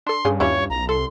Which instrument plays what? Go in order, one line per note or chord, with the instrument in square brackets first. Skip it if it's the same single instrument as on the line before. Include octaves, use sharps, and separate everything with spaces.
[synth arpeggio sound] D4 A4 [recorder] C6
[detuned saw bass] G2 [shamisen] C#3 G#4
[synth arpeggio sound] D#2 G4 [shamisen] C#4 E4 F4 [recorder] C#5
[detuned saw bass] B1 [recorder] A#5
[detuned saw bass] C2 [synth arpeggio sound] A4 [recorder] C6